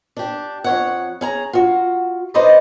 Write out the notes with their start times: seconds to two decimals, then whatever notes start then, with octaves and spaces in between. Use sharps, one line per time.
0.17 D4 G4
0.64 F2 C#5 F#5
1.21 C#4 G#4 A#5
1.53 F4 F#4
2.34 D#4 B4 C5 D5 D#5 A#5